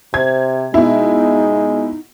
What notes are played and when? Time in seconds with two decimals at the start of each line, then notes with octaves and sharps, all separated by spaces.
0.14 C3 C5 G#6
0.74 B2 G#3 D#4 E4